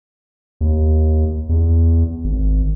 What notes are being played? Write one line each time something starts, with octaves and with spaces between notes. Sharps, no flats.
D#2
E2
G#1